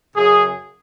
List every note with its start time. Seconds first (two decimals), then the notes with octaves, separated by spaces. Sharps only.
0.14 F#2 C#3 G#4